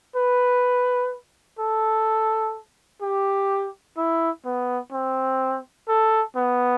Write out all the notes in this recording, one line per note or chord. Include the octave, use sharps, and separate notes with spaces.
B4
A4
G4
E4
B3
C4
A4
B3